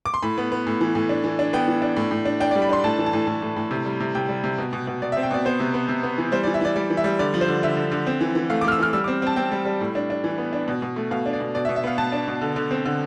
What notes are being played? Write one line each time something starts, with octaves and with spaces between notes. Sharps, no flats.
D6
C6
A2 B5
B3
B3
A2
E3
A2
D4
E3
D4
B3 G5
E3
D4
A2
A2
D4
D4 G5
D5
G3
B5
D4 C6
A2 A5
E3
A5
A2
A2
A2
A2
C3
G3
C3
C3 G5
G3
C3
B2
B2
B2
B2 D5
E5
C4
G5
B2 D5
B3 C5
C3
B3
C3
B3
E3
G3 C5
D5
E3
E5
E3 D5
G3 D5
E3
E5
G3
D3 D5
F3
C5
D3
D3 E5
D3
D3
C4
E3
E3
A3 F5
D6
A3 F6
E6
E3 F6
G3 E6
D6
C4
C4 A5
C4 G5
G3
G3
A2
D4
D4
E3
B3
D4
B2
B2
A3
B2 F5
D4
D5
B2
B2 D5
E5
B2
E5
B3 F5
B2 A5
D4
B2
D3
D3
C4
D3